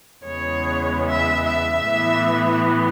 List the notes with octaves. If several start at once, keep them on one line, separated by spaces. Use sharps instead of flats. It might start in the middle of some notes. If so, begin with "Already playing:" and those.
E2 C#3 G#3 B3 C#5
E5
E5
A2 E3 B3